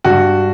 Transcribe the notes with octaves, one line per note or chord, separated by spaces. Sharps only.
G2 F#4